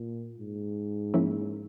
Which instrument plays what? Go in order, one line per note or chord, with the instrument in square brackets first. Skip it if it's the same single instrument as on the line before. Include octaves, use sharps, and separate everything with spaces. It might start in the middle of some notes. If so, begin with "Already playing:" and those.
Already playing: [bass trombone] A#2
G#2
[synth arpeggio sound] F3 A#3 C#4 E4